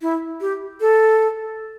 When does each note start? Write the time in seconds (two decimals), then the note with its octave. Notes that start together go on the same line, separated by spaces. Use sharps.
0.02 E4
0.41 G4
0.81 A4